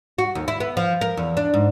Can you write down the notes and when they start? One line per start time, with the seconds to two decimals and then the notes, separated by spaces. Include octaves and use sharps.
0.19 F#4
0.35 D#2
0.48 E4
0.60 B3
0.77 F3
1.01 A#4
1.17 E2
1.37 D4
1.54 G#2